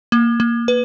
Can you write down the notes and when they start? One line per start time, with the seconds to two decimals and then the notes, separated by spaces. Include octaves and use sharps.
0.12 A#3
0.40 A#3
0.68 B4